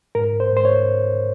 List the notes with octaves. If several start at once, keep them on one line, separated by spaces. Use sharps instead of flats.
G#2 A#4
C5
G#2 C5
C#5